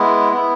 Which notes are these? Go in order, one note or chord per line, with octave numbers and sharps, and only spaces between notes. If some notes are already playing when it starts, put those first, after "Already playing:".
Already playing: G#3 B3 E4
B3 E4